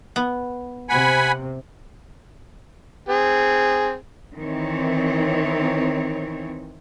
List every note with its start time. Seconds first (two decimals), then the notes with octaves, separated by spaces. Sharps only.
0.16 B3
0.89 C3 F#5 G#5 B5
3.09 C4 G#4
4.37 D#3 E3 C4 C#5